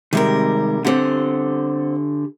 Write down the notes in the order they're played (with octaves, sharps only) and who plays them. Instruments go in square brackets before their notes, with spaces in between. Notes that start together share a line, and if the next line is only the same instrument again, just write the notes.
[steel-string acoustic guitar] C3 G3 A#4 [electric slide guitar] D#3 G#3
[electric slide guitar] D3 G4 A4 [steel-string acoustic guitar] C4 F#5